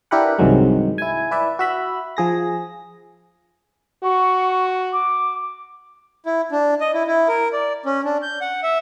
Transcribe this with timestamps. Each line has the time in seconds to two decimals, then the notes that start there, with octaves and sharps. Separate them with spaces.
0.11 D4 E4 G4 A#4 B4 F#5
0.39 C2 G2 C3 D#3 F#3 G#3
0.98 E4 G#5
1.31 E4 B4 D5 E5
1.59 F#4 E5 B5
2.17 F3 G#4 A#6
4.04 F#4 C#6
4.92 D6
6.26 E4
6.52 D4
6.81 D#5
6.94 E4
7.07 E4
7.28 A#4
7.53 D5
7.86 C#4
8.05 D4
8.22 G6
8.41 F#5
8.63 E5